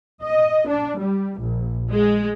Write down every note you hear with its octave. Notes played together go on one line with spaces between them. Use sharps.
D#5
D4
G3
A#1
G#3